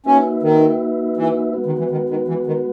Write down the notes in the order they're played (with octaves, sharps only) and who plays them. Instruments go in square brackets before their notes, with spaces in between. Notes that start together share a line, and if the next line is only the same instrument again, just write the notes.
[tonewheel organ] A#3 D#4 F#4 B4 E5 [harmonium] C#4
[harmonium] D#3
E3
[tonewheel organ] G#3 B3 F#4 B4
[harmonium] D#3
E3
D#3
D#3
E3
D#3